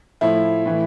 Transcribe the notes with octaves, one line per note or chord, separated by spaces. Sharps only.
A2 F3 E4
A2 E3